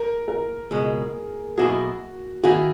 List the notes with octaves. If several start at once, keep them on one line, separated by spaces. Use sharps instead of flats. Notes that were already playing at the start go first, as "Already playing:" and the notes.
Already playing: A#4
A#4
C#2 B2 G#3 G#4
B1 B2 A#3 E4 F#4 G#4
D#3 A#3 E4 F#4 G#4